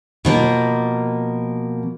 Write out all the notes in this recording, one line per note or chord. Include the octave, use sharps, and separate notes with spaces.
B2 F3 A#3